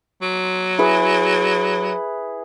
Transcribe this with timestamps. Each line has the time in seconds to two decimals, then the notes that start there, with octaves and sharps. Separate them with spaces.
0.22 F#3
0.79 E4 G#4 B4